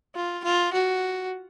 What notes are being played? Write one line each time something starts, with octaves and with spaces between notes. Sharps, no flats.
F4
F4
F#4